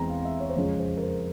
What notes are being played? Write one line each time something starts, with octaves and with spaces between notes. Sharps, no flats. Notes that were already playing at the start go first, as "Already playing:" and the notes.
Already playing: E2 E3 G#3 C4 A#5 C6
F5
E5
C#5
C5
F2 C#3 F3 G#3 C#5
C5
A#4
C5